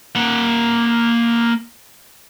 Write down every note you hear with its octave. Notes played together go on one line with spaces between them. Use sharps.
A#3 F#5